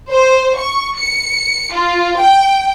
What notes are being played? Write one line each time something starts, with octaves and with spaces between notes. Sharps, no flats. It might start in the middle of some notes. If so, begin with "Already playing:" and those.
C5
C#6
C#7
F4
G5